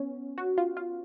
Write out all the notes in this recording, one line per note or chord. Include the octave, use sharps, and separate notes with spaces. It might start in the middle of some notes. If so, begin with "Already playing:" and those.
Already playing: B3 C#4
F#4
F4
F4